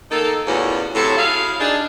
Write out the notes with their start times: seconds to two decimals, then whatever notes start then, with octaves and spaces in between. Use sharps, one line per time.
0.11 D#3 A#3 D#4 A4
0.47 E2 A2 D3 C#4 F4 F#4
0.95 A2 C3 F#3 A4
1.17 E4 F#4 G#4 F5
1.59 D4 D#4 G#4